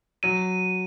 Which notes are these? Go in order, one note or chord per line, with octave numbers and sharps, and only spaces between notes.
F#3 D#7